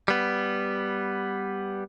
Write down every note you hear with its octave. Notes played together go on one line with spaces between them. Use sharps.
G3 B3